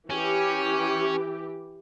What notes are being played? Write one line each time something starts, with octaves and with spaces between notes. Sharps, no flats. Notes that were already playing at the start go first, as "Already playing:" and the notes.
E3 C#4 G4